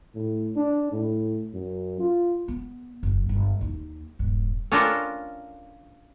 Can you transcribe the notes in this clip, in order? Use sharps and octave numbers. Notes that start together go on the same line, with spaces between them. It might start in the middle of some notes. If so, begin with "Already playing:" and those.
A2
D4
A2
F#2
F4
B3
F#1 F2
G1
D#2 D#4
D#1 G2
C#4 D4 F4 A4 A#4 G5